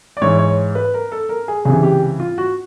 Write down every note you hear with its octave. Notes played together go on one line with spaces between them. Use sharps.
D5
G#2 E3 C#5
C#5
B4
A#4
A4
A#4
G#4
C#2 C3 E3 G#4
G4
F4
F#4